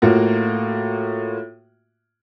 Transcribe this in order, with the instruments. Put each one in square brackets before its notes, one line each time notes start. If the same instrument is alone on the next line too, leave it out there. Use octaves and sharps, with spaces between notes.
[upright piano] A2 A#3 F4 F#4